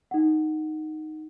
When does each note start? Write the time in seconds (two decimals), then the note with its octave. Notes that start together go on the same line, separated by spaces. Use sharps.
0.11 D#4 F#5